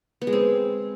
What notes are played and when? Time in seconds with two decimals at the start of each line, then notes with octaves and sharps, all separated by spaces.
0.21 B3
0.27 G#3
0.33 C4